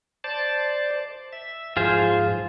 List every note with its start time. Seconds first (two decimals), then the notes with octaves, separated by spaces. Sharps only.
0.24 C5 D5 A5
1.33 E5
1.77 G#2 F3 F4 G#4 C5